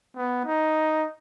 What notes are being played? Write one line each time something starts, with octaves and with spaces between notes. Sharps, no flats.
B3
D#4